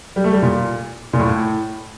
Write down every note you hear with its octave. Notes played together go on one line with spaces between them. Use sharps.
G3
A3
G3
A#2
A#2
A2